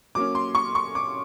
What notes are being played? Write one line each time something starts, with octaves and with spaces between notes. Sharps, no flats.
F#3 A#3 C#4 D6
C6
C#6
C#6
D6